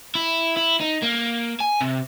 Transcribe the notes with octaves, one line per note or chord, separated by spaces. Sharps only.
E4
E4
D#4
A#3
G#5
C3